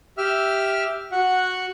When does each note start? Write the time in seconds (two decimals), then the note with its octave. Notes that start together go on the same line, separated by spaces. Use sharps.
0.18 G4 E5 F6
1.12 F#4 F#5